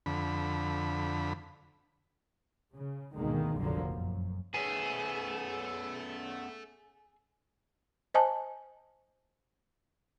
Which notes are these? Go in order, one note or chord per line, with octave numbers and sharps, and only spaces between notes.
F2 D3 B5
C#3
D2 G#2 B2 D#3 G#3 A#3
F1 A#1 D3 F3 F#3 A#3
F#2
B3 C#4 G#4 A4 E5
C5 D#5 G#5 A5